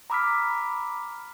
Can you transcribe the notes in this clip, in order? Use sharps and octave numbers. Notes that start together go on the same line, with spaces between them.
A#5 B5 D6 E6 F6 B6